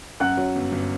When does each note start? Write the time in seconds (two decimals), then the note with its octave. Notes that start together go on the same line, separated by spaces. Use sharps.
0.20 F#2 F#5 F#6
0.37 F#3
0.56 G1
0.72 G1